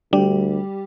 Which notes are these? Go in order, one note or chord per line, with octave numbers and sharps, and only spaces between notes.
D2 G3 D4 G4